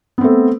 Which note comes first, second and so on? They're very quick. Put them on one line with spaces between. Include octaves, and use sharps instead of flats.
B3 C4 A3